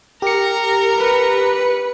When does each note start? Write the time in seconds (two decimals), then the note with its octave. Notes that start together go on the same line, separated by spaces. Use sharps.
0.22 G4 A#4 C#7
0.97 B4